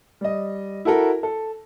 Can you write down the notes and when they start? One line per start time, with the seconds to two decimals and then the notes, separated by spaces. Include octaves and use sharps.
0.21 G3 D#5
0.85 E4 F#4 A4 A#4
1.23 A4